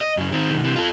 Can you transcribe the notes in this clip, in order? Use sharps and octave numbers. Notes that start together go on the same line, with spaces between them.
D#5
F#2 C#3
D#3 C4
B1 D#3
C3 E3
F4 A4